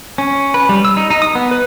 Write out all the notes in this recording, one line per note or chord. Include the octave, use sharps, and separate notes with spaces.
C#4
B4
G3
E6
D#4
D#4
D#6
B3
B4